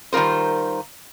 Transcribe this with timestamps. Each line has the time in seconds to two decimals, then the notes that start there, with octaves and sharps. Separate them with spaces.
0.13 D#3 G3 F4 A#4 C5